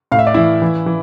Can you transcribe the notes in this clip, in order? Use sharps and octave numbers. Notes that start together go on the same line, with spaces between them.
A2 F5
E5
D5
E3 E4 E5
E3
E3